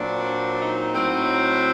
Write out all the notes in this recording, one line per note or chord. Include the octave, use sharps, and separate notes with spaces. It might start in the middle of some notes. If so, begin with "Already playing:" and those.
Already playing: A#2 F#3 C4 D4
D#4
A2 F#3 C4